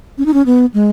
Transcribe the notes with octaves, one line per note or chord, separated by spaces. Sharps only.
C#4
D#4
C#4
B3
G#3